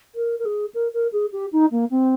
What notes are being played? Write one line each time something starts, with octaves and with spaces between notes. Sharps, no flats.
A#4
A#4
G#4
A#4
A#4
G#4
G4
D#4
A#3
C4